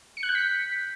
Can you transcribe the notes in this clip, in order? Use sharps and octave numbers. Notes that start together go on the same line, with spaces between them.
C#7
F#6
G6
B6